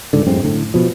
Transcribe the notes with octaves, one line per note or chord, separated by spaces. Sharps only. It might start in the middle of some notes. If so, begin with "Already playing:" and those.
C#2 G#2 D3
A1 F#2 G#3 C4
A2 D3
B2 F3